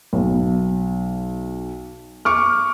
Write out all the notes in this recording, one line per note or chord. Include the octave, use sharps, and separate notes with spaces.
B1
C#6 D6 F6